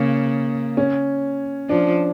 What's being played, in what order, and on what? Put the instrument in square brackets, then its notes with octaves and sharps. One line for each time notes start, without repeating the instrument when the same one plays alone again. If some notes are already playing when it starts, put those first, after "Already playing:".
Already playing: [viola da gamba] C#3 [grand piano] A#3
[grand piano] C#4
[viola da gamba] F3 [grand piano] D4